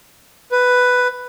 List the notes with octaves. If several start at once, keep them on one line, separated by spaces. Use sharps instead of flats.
B4